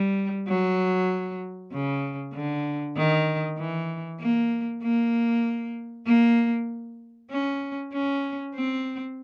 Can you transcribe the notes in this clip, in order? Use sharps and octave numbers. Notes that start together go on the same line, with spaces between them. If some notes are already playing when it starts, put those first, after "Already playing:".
Already playing: G3
F#3
C#3
D3
D#3
E3
A#3
A#3
A#3
C#4
C#4
C4